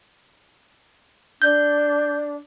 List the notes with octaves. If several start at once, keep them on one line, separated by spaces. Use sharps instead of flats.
D4 G6